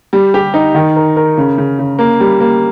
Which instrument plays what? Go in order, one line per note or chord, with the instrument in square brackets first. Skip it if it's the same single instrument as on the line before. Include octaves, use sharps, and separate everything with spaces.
[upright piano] G3
G4
D#4
D#3
A#4
A#4
C#3
C#3
C#3
A#3
G3
A#3